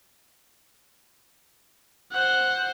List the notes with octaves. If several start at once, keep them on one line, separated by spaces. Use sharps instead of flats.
C5 F#5